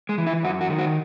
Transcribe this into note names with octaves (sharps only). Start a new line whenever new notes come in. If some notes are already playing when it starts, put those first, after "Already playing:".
G#3
E3
E4
F#2 F#4
F#4
D#3
F#4